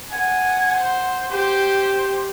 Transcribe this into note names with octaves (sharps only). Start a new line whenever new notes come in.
F#5 G#5
C5
G4 C5